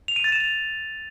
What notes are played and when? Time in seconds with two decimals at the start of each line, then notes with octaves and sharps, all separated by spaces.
0.08 F7
0.16 D#7
0.24 A6
0.32 E7
0.40 F7